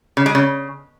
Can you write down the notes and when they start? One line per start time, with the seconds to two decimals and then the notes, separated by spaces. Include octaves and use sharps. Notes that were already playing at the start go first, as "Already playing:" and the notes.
0.17 C#3
0.26 G#3
0.35 C#3